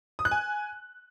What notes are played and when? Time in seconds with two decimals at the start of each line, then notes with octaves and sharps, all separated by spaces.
0.19 D#6
0.25 F#6
0.31 G#5